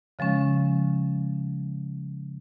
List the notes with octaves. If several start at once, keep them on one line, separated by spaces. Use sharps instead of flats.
C#3 F3 G#3 C#4